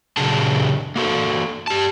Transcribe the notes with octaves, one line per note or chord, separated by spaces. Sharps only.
A#2 C#3 F#3 D4 G#4 A5
A#3 F#4 A4
G4 A5